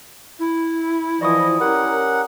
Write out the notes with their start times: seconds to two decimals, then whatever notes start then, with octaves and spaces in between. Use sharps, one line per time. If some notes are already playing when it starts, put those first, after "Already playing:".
0.39 E4
1.21 E3 F3 D5 D#5 C#6 D#6
1.61 C#4 G4 A#4 F#5